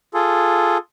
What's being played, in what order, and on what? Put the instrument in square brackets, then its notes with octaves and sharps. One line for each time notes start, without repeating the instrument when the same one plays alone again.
[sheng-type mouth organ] F4 G#4 A4